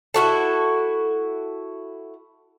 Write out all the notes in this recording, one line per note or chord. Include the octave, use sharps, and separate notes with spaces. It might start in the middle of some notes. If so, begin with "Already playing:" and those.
E4 F#4 A4